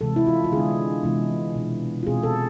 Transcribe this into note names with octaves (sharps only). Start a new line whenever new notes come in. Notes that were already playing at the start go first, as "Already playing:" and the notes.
C3 E3 G#3 C4 A4
E4
F4
F4
D3 G#3 B3 D4 G#4
C3 E3 G#3 B3 E4
B2 G#3 D4
F4
B2 G#3 C4 G#4
A4